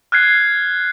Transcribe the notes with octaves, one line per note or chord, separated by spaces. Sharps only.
F6 F#6 G#6 C7